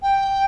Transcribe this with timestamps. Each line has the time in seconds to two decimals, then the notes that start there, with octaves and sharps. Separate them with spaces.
0.03 G5